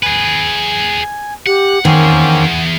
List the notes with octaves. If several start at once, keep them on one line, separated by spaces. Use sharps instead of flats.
G#4 B4 G#5
G4 F#5
D#3 E3 A#3 C4 C#4 G#4 F#5